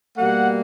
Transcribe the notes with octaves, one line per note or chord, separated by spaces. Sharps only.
B2 G3 A#3 F#5